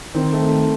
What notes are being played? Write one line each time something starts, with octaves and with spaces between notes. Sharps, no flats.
D#3 C4
A3